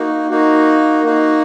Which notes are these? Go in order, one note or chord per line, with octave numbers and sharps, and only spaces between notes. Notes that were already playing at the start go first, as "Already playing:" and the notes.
Already playing: A#3 D#4 F#4
A#3 D#4 F#4
A#3 D#4 F#4